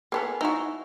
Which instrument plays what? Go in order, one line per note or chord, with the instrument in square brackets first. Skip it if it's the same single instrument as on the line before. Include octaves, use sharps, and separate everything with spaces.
[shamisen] A#3 B3 A4 [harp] G#4 F6
[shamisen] D#4 F#4 [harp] E4